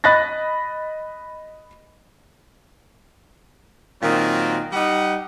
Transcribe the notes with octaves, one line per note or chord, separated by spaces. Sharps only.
D#5 B5 F#6 A6 A#6
A#2 D#3 F#3 C4
G3 D#4 F#5